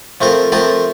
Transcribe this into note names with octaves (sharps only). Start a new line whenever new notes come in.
F3 A3 C4 F4 A#4
F3 A3 C4 F4 A#4